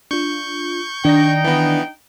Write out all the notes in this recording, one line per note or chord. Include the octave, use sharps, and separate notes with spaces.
D4 F4 C#6 G6
D#3 D4 D#4 D5 G5 A#6
E3 B3